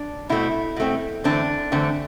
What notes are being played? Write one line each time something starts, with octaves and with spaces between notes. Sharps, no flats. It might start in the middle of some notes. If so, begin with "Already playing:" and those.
Already playing: D4
B2 A3 C4 E4
B2 A3 C4
E2 D3 A3 C4 D4
E2 D3 A3 C4